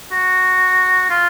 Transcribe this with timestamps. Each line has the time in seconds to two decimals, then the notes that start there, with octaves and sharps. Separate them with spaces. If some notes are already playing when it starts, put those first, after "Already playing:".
0.12 F#4
1.10 F4